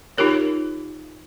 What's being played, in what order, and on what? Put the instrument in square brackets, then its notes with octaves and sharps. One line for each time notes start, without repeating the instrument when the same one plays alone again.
[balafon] D#4 F4 G4 A#4 C#5